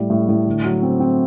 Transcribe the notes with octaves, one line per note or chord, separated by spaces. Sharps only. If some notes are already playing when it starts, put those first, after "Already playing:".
Already playing: A2 G3
A2
A2
D3
F#3
C4
C4